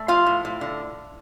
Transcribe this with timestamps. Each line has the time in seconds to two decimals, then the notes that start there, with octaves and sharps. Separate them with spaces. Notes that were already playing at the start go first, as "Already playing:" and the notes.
Already playing: A3
0.08 F3 F4 F5
0.26 A2
0.45 A2
0.61 D3